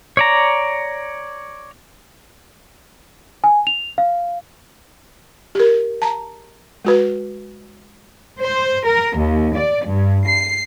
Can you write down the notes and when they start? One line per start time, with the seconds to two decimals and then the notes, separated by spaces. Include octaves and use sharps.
0.17 C#5 D5 A#5
3.44 G#5
3.67 F7
3.98 F5
5.55 G4 A#4
6.02 A5 A#5
6.85 G#3 F#4 B4
8.38 C5
8.85 A#4
9.16 D#2
9.56 D5
9.86 G2
10.27 C7